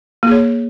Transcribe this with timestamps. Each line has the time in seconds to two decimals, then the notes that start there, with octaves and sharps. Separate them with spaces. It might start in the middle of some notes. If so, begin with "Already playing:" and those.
0.23 A#3
0.27 G#4
0.31 C#5